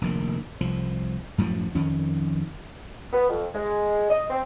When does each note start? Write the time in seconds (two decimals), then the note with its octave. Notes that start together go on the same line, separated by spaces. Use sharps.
0.01 F1 A#1 D#3
0.60 C2 F3
1.38 F#2 A2 F3 F#3
1.75 F2 D#3 C#4
3.13 B3
3.30 F2
3.54 G#3
4.10 D#5
4.30 C4